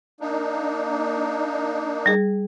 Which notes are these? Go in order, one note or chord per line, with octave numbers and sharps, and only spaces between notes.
A#3 D4 D#4
G3 G#4